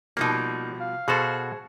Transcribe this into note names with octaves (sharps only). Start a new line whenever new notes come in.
B2 F3 G3 A#3 D#4
F5
B2 F#4 G#4 A4 C5